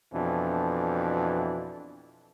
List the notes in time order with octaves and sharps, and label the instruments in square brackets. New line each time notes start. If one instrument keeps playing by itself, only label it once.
[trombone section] F2 B2 E3 D4